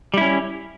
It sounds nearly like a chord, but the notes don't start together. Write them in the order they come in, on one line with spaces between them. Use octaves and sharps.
G3 E4 C#4